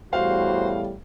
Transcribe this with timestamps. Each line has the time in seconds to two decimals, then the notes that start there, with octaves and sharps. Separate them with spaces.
0.13 E2 A2 G3 F#4 C5 F5